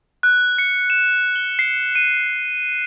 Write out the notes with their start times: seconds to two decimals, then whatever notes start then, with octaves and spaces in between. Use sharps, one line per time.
0.23 F#6
0.58 C#7
0.90 E7
1.36 G7
1.59 C7
1.95 D#7